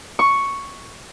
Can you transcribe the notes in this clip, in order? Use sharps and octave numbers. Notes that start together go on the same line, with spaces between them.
C#6